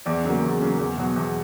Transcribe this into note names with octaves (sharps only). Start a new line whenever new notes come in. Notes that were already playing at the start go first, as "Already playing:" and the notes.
E2 D5
C#3 F#3 A#3
E2
C#3 F#3 A#3
E2
B2 F#3
E2